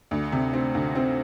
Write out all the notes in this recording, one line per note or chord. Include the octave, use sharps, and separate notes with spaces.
D2
C3
C4
D2
C4